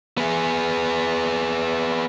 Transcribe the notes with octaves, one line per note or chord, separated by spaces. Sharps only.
B3 G#4